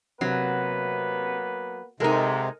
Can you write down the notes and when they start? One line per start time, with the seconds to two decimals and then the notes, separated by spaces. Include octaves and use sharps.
0.21 C3 F#3 A#3 B3 B4
2.00 G#2 C3 G#3 D#4 A4 A#4 D#5